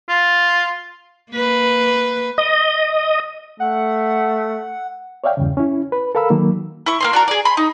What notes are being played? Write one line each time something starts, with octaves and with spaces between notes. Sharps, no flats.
F4
A#3 B4
D#5
A3 F#5
C#5 D5 E5 F5 G5
E2 G2 C#3
C#4 E4
B4
A4 A#4 F5 B5 E6
D#3 F#3 A#3
E4 C#6
A#3 C4 C6
D4 F#4 A#4
G#4 D5
B5 C6
D#4